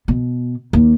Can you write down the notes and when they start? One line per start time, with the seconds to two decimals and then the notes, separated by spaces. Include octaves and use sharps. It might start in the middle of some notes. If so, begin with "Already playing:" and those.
0.08 B2
0.73 D#2